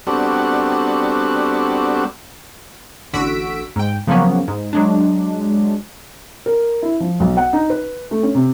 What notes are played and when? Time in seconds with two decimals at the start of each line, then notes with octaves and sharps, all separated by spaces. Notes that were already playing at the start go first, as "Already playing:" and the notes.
0.07 G3 B3 C4 D4 F#4 A4
3.13 A1 D3 F#4 E6 B6 D7
3.76 G#2 G5
4.07 C#3 F3 F#3 A#3 B3 C#4
4.48 G#2
4.73 F#3 G#3 D4
6.46 A#4
6.82 E4
7.00 F3
7.20 B1
7.37 F#5
7.53 D#4
7.70 B4
8.11 A3
8.23 C#4
8.35 C3